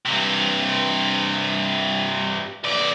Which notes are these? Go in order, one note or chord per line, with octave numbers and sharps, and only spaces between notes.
G2 C3
B1 D5